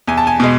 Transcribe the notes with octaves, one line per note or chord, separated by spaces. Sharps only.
E2 G#5
A5
G#5
B2 G#3